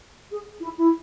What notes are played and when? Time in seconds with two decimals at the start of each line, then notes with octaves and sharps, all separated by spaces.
0.32 G#4
0.62 E4
0.77 E4